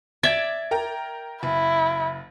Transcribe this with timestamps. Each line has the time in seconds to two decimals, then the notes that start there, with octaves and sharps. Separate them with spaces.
0.23 D5 E5 G#6 A6
0.71 A#4 G5 A#5
1.43 F#1 E4